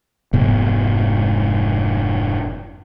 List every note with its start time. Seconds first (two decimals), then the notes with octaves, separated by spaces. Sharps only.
0.33 F1 G#2 B3